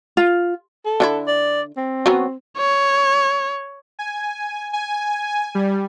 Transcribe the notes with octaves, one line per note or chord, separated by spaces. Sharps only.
F4
A4
D3 C#4 E4
D5
C4
F#3 B3 C#4
C#5
G#5
G#5
G3